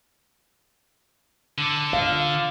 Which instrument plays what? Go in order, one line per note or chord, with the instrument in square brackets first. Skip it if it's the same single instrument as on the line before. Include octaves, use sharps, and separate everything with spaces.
[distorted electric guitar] D3
[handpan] F5